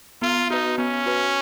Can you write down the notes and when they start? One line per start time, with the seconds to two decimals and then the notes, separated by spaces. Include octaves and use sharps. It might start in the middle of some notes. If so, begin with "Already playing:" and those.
0.22 B3 F4
0.50 D#4 F#4 B4
0.78 B3 C#4
1.06 F#4 B4